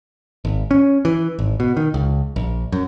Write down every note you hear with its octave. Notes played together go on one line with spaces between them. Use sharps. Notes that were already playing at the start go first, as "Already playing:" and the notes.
G#1
C#4
E3
G#1
B2
D#3
C#2
A#1
F#2